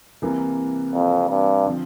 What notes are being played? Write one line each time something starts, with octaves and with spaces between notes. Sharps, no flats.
C2 C3 E3 A#3
F2
G2
D3 F3 C4